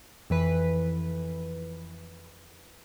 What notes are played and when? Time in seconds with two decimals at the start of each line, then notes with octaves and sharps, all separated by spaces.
0.30 F2 E3 B4